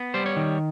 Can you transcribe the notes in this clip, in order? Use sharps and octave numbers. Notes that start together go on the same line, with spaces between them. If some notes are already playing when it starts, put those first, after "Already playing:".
Already playing: B3
G3 C5
C#5
D#3